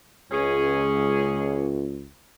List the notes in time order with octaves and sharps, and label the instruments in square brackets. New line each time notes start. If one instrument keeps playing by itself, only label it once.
[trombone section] C#2 [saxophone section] C#4 G#4